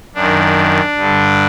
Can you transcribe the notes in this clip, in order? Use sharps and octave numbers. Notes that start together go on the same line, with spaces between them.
F#2 D#3 D4
G2 D3